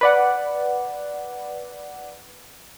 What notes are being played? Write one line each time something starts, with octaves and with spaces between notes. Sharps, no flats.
B4 D5 F#5